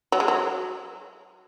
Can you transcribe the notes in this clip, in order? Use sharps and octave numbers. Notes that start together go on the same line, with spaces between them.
F#3
G#3
F#3